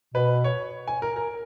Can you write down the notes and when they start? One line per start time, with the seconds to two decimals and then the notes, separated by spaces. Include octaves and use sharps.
0.15 B2 B4
0.44 C#5
0.88 G#5
1.02 A#4
1.16 A#4